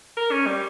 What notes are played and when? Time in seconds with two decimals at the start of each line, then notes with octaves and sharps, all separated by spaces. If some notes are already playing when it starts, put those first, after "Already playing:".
0.17 A#4
0.31 C#4
0.46 G3